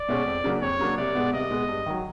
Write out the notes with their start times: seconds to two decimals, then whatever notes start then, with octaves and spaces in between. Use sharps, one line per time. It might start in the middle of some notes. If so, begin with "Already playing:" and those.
Already playing: D5
0.09 B2 G#3 C#4
0.26 F2
0.44 C#3 F#3 A#3 D4
0.62 F2 C#5
0.79 C#3 F#3 A#3 D4
0.97 C2 D5
1.15 B2 G#3 B3
1.33 C2 D#5
1.51 B2 G#3 B3
1.69 G2
1.86 D#3 F#3